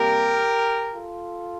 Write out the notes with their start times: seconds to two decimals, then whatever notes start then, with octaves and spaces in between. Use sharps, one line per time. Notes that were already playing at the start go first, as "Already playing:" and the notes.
Already playing: C3 G3 A#3 G4 A#4
0.95 F4 A4